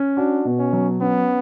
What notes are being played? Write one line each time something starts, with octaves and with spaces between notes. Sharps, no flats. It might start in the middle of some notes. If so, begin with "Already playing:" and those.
Already playing: C#4
D4 F#4
B2
C#4
F#3
B3 C#4